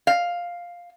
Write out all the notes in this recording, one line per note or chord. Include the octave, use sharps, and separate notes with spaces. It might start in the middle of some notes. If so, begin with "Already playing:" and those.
F5